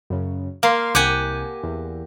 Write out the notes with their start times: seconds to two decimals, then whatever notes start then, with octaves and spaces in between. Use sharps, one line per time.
0.10 F#2 C#3
0.63 A#3 F5 C6
0.95 C2 G4 F#5 G#5
1.63 E2